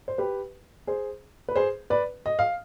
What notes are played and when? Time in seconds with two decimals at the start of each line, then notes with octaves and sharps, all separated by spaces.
0.08 C5
0.18 G4 B4
0.87 G#4 C5
1.49 B4
1.56 G#4 C5
1.90 B4 D5
2.26 D#5
2.39 F5